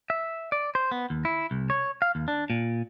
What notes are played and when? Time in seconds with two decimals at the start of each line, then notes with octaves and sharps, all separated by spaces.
0.10 E5
0.52 D5
0.75 C5
0.91 B3
1.10 D#2
1.25 E4
1.51 C2
1.70 C#5
2.02 F5
2.15 D#2
2.28 D4
2.50 A#2